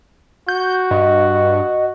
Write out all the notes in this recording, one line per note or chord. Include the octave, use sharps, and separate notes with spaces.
F#4 G6
G2 D#5